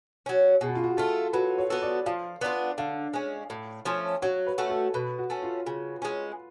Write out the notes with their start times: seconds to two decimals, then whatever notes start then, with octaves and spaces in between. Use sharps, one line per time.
0.26 F#3 C#4
0.61 B2 G#4
0.68 F#4
0.75 F4
0.84 F#4
0.97 A3 F4 A4
1.33 F#3 B4
1.58 C#5
1.70 B3 F#4 A4
1.82 D5
2.06 F3 F5
2.41 B3 D4 F4 D5
2.78 D3 F5
3.14 G#3 C#4
3.50 A2
3.85 F3 A3 C#4
4.22 F#3 C#5
4.47 B4
4.58 A3 C#4 F#4
4.70 A4
4.94 B2 B4
5.18 F#4
5.30 A3 C#4
5.42 F4
5.67 C#3
6.02 G#3 C#4